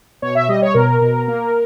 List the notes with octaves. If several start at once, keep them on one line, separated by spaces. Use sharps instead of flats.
B2 C#5
E5
G3 D#5
C#5
B2 A#4
B2
A#3